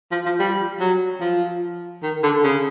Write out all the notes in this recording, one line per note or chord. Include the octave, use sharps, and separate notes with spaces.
F3
F3
G3
F#3
F3
D#3
D3
C#3